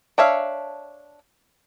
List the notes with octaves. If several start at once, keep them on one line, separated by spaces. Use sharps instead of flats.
D4 C#5 E5 F5